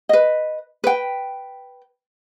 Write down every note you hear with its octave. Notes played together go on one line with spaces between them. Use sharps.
B4 D#5
B4 G5